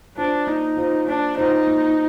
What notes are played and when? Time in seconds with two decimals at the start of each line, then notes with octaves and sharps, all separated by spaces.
0.17 D4 F4 C5
0.47 A#3 D#4
0.77 F4 C5
1.07 A#3 D4
1.37 D#4 F4 C5
1.67 A#3